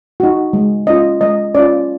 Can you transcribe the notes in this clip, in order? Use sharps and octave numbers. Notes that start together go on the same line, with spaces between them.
D#4 F#4
G#3
C#4 F4 D#5
G#3 D#5
C#4 F4 D5